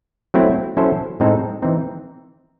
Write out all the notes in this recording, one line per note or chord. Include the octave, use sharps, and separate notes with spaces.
F#3 A3 C4 E4
F#3 C#4 E4 A4 C5
A2 G#3 C4 D#4 A4
E3 C4 D#4